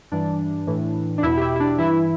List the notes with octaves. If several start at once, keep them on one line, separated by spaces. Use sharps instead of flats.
G2 E3 D4
A2 E3
D4
E2 B2 E4
G4
E4
E4
D4
G2 E3 E4